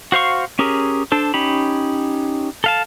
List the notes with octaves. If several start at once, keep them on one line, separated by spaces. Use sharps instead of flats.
F#4 C5 F5 C#6
C#4 G4 G#4 A#4
D4 A4 C5
C#4 D#4 G4 B5
A4 F5 A5